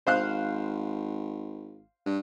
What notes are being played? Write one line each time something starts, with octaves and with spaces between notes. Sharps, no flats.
G#1 C5 F5 F#6
G2